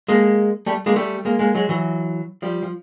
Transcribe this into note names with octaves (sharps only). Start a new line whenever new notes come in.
G#3 A#3
G3 A3
G#3 A#3
G3 A3
G#3 A#3
G#3 A#3
F#3 G#3
E3 F#3
F3 G3
F3